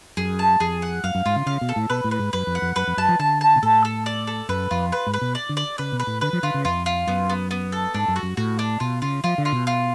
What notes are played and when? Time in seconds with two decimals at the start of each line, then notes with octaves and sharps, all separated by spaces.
0.17 F#2 G#4
0.39 A5
0.60 F2 G#4
0.82 F#5
1.04 F#2 F5
1.15 F#2
1.26 G#2 F4
1.36 C#3
1.46 C#3 F5
1.61 B2
1.69 A4
1.76 A2
1.90 B2 B4
2.04 A2
2.11 B4
2.19 G#2
2.33 F#2 B4
2.47 F2
2.55 F#5
2.62 F2
2.76 F#2 B4
2.87 F2
2.97 F#2 A5
3.08 F3
3.19 D3 A5
3.41 A5
3.56 B2
3.63 A2 A4
3.85 A4
4.06 D5
4.27 A4
4.49 F#2 B4
4.71 F2 F4
4.92 B4
5.06 G#2
5.14 B4
5.21 B2
5.35 D5
5.49 D3
5.57 D5
5.78 C#3 B4
5.92 B2
6.00 B4
6.07 A2
6.21 D3 B4
6.33 F3
6.43 D3 F4
6.54 C#3
6.65 F2 F4
6.86 F4
7.07 F#2 B3
7.30 B3
7.51 B3
7.72 A4
7.94 G#2 D4
8.08 F#2
8.16 F#4
8.23 F#2
8.37 A2 F#4
8.59 D4
8.80 B2 F4
9.02 C#3 F4
9.24 F3 F4
9.38 D3
9.45 F4
9.52 B2
9.67 F4